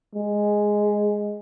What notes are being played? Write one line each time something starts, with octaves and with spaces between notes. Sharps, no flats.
G#3